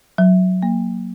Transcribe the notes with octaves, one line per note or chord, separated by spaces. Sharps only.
F#3
A#3